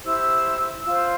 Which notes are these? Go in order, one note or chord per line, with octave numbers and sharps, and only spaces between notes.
E4 G4 C5 E6
F4 C5 E6